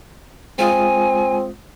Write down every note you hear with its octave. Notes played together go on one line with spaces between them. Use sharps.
G#3 C4 F4 G#5 D#6